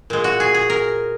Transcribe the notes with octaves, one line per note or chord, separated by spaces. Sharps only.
A#2 G#3
F#4
G#4
G#4
A#4